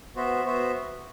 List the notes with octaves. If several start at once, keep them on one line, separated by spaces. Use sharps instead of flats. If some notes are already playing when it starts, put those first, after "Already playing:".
B3 F#4 C5 E5
B3 F#4 C5 E5